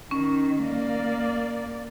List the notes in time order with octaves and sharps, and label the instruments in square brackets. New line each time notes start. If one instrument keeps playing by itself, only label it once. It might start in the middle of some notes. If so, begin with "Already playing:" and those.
[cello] D#3 [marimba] C#4
[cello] A#3 D5